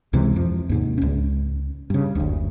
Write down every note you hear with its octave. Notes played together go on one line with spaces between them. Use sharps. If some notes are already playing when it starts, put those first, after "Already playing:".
C#2 C3 E3 G#3
F2 F3
D#2 G#2 C3
C#2 C#4
G2 C#3
F#1 D2